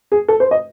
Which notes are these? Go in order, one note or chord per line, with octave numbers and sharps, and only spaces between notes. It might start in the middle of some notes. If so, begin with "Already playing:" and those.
G#4
A4
C5
D#5